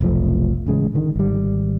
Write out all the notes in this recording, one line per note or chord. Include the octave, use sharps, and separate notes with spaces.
F1 B1 F3 A3
A1 C#3 G#3
D3 D#3
G#1 G3